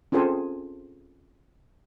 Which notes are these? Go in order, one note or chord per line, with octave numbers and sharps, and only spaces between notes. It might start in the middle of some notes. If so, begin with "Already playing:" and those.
C4 C#4 F4 G#4 A4 C5